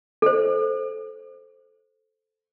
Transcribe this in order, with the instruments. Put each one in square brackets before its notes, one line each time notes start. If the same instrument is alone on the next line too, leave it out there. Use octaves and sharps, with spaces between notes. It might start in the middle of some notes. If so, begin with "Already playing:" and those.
[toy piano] A4 C5